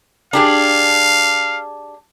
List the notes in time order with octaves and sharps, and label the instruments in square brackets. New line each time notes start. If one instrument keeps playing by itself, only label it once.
[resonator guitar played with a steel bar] D4 G4 G#4 [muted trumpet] F5